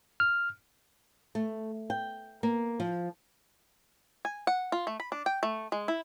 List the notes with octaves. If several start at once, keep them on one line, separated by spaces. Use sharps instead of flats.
F6
A3
G5
A#3
F3
G#5
F#5
F4
A3
B5
D4
G5
A3
G#3
E4